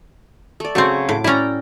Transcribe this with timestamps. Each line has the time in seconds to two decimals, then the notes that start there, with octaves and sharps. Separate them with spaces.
0.60 A3 D5
0.75 C#3 F#3 A3 C4 C#6
1.09 A2 D6
1.24 C#4 E4 D5 G5 A#5